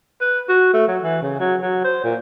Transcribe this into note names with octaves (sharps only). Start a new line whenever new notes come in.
B4
F#4
A3
F#3
E3
C#3
F#3
F#3
C5
A#2